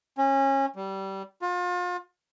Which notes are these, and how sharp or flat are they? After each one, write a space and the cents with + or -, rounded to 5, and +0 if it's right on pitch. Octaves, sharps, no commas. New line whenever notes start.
C#4 -25
G3 -20
F4 +35